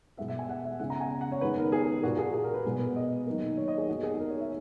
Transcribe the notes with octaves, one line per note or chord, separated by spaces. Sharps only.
B2 G#3 B3 E5
E5
G#5
F#5
E5
C#3 G#3 B3 F#5
A#5
G#5
F#5
C#5
D#3 G#3 B3 B4
A#4
G#4
A#2 A#3 F#4
G#4
G#4
A#4
B4
B2 G#3 B3
D#5
D#3 F#3 A#3
C#5
D#5
G#4
D#3 G#3 B3 F#4
G#4
A#4
C#5
E5